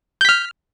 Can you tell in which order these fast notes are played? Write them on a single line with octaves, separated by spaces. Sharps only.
G6 B6 F6